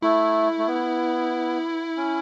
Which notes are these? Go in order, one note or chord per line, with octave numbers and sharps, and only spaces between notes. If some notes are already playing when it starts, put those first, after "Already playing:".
A3 E4
A3
B3
C#4